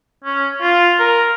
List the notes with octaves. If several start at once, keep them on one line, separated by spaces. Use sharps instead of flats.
C#4
F4
A#4